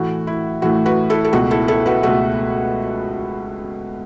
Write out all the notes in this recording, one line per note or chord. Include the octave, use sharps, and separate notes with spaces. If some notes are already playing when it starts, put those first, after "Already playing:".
Already playing: A2 E3 A3 F#4
E4
A2 E3 A3 F#4
F#4 B4
E4 A4
A4
C#2 B2 A3 F#4
E4 A4
E4 A4
F#4 B4
C#2 B2 A3 F#4